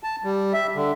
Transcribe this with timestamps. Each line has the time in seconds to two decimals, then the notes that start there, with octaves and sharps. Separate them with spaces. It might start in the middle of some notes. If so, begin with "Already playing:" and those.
0.03 A5
0.24 G3
0.53 E5
0.76 D3